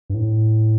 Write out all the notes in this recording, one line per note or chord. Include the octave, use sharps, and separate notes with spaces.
G2
A2